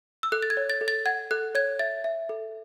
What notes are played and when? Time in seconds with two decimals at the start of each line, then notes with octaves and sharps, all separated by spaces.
0.23 E6
0.32 A4 F#6
0.43 A6
0.50 G#6
0.57 C#5
0.70 A6
0.81 A4
0.88 A6
1.06 F#5 G#6
1.31 A4 F#6
1.55 C#5 G#6
1.79 E5 A6
2.04 E5
2.29 A4